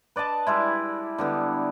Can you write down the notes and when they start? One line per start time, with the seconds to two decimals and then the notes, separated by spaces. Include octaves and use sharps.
0.16 B4 D5 D#5 A5
0.47 G3 G#3 E4
1.18 D3 G3 B3